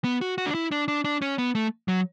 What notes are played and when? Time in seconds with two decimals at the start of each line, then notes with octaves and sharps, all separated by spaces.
0.04 B3
0.21 F#4
0.38 F#4
0.46 D4
0.55 E4
0.72 D4
0.88 D4
1.04 D4
1.22 C#4
1.38 B3
1.55 A3
1.88 F#3